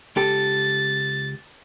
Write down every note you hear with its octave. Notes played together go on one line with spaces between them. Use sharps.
C#2 G4 A4 A6